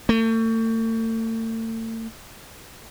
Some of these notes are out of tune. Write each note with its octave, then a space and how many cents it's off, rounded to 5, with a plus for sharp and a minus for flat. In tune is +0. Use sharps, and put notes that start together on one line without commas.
A3 +40